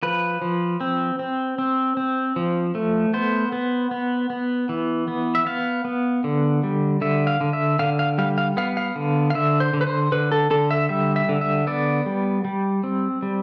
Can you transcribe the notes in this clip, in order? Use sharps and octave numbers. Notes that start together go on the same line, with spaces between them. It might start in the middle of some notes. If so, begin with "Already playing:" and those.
F3 B4
F3
C4
C4
C4
C4
F3
A3
B3 C5
B3
B3
B3
E3
B3
E5
B3 F5
B3
D3
G3
D3 E5
F5
D3
E5
D3 F5
F5
G3 F5
F5
B3 F5
F5
D3
F5
D3 E5
C5
D3
B4
C5
D3 B4
A4
D3 A4
E5
G3 E5
E5
D3
E5
B3 D5
G3
G3
C4
G3